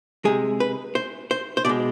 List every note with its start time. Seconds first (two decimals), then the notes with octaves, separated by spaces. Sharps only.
0.25 C3 G#3 G#4
0.60 B4
0.95 C5
1.31 C5
1.57 C5
1.65 B2 G#3 D5